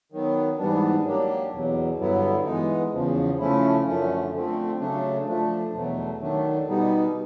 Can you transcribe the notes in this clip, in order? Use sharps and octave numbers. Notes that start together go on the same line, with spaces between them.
D#3 F#3 B3
G#2 E3 G3 B3 D4
F#3 A#3 D4 G4
E2 B2 F#3
G2 D3 F#3 B3 E4
E3 G#3 B3 D#4
E2 C#3 F3
C#3 F3 A3 C#4 E4
F#2 D3 F3 A3 C#4
D3 F3 A3 C4
C#3 F#3 A3 D4
F3 A3 D4
E2 B2 F#3 A3
D#3 F#3 A3 D4
B2 G3 B3 D#4